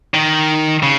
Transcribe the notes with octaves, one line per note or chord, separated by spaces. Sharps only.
D#3
C#3